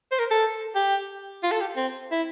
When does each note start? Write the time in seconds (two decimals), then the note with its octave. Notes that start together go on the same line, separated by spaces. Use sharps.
0.12 C5
0.19 A#4
0.31 A4
0.75 G4
1.43 F4
1.51 A4
1.61 G4
1.77 C4
2.12 E4